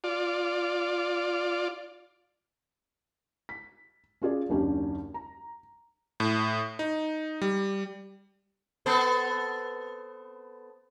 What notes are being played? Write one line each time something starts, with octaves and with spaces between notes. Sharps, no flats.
F4 D5
B6
C#4 F4 G#4 D5
F#1 D#2 C#4 D4 G4
A#5
A2
D#4
G3
B3 A4 C5